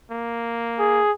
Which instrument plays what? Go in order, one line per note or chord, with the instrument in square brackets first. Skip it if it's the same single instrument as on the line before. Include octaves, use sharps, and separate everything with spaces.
[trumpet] A#3
[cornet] G#4